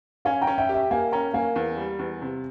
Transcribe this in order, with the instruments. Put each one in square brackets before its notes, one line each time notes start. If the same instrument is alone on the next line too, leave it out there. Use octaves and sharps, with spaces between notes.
[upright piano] C#4 [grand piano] F5 G#5
[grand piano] G5 A#5
[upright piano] C#4
[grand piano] E5 G5
[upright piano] G4
[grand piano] E5 G5
[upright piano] A#3 [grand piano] F5 G#5
[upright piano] C#4 [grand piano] G5 A#5
[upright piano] A#3 [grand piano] F5 G#5
[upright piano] E2
G3
E2
C3